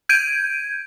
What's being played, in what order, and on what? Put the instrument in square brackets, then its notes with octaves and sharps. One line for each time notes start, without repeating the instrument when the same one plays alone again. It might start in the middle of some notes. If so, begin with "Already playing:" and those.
[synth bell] G6 G#6 D7 D#7